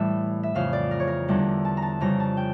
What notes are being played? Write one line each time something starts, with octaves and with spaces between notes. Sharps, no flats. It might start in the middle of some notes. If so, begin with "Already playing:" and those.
Already playing: A2 E3 G3 E5
E5
F2 C#3 E3 F5
D5
A#4
C#5
A#4
E2 D3 G3
A5
A#5
A5
F2 C#3 G3 A#5
A5
G5